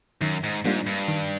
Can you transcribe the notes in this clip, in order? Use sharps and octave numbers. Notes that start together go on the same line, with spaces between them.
F#2 D#3
G#2
G#2 G3 A#3 D4 F4
G2
D#3